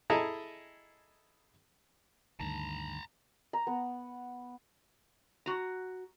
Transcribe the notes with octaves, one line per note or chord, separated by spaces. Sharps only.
E4 G#4 A4 D#5 A#5
D2 G2 D#3 A5 A#5
A#5
B3
F#4 A#5